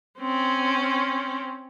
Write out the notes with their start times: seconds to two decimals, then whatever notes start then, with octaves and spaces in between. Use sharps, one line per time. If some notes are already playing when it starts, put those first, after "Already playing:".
0.19 C4 C#4